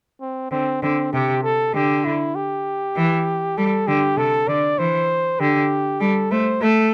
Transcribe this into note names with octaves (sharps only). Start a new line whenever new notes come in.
C4
D3 C4
D3 C4
C3 G4
A4
D3 G4
E4
G4
E3
G3 A4
D3 G4
C3 A4
D3 D5
E3 C5
D3 G4
G3 A4
A3 C5
A3 A4